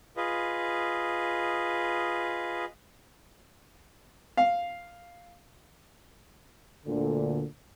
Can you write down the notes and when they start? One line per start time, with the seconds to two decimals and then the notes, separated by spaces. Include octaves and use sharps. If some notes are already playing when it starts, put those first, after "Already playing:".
0.17 F4 G#4 B4 D#5
4.37 F5
6.85 D2 A#2 D3